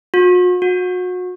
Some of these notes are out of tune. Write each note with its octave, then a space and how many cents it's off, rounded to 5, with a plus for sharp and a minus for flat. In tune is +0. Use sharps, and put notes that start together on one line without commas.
F#4 -45
F#4 -30